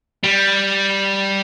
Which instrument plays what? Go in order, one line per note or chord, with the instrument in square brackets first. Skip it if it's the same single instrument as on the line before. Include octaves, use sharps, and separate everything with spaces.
[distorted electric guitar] G3